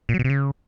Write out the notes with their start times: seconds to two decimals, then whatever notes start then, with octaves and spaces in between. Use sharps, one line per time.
0.09 A#2
0.14 F#3
0.19 B2
0.24 C3
0.30 C#3